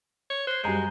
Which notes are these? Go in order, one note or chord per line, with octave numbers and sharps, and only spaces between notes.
C#5
C5 F#6 C7
F#2 G3 G#3 F#4 G#5 A#5 G6